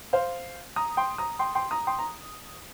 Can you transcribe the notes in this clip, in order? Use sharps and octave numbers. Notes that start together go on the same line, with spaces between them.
C5 F5
A#5 D#6
G5 C6
A#5 D#6
G5 C6
G5 C6
A#5 D#6
G5 C6
A#5